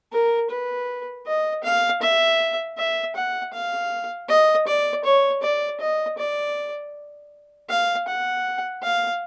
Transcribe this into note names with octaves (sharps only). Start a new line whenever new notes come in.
A#4
B4
D#5
F5
E5
E5
F#5
F5
D#5
D5
C#5
D5
D#5
D5
F5
F#5
F5